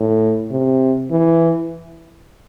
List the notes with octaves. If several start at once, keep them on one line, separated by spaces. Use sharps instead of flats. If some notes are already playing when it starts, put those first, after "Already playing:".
Already playing: A2
C3
E3